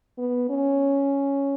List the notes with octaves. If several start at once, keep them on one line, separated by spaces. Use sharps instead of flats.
B3
C#4